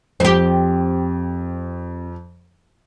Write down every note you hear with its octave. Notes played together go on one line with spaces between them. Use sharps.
F2 C4 G4